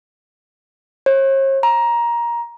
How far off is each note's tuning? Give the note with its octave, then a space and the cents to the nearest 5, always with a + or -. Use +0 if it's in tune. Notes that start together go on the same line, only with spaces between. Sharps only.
C#5 -45
A#5 +15